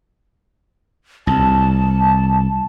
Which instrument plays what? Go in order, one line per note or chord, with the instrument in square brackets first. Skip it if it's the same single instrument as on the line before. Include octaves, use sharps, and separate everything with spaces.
[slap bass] C2 [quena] A5